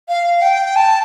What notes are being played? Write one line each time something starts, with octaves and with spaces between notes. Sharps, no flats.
F5
G5
A5